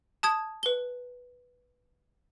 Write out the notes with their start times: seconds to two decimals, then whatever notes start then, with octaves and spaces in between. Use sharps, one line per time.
0.23 A5 D#6 G#6
0.63 B4 G7